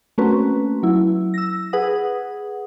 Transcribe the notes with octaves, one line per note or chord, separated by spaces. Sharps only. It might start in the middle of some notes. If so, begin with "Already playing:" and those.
A3 A#3 C4 C#4 F#4 B4
F#3 E4
E6 A#6
G#4 B4 F#5 D#6